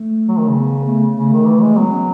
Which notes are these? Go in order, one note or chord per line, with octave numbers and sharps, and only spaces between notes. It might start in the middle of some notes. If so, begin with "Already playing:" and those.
Already playing: A3
F#3
D#3
C#3
B3
A3
C#3 A3
D#3
E3
G#3
F#3 B3
C#4